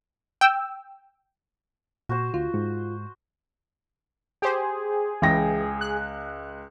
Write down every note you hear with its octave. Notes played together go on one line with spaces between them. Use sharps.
G5 E6
A#2 F#4 C5
D2 F4
G#2
G4 G#4 C5
C#2 E3 G5 A#6
F#6